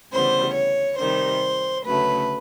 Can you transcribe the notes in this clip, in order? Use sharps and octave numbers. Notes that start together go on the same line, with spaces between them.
D2 C#3 E3 G3 B3 C5
C#5
C3 D#3 G3 C5
D2 C#3 F#3 A3 B4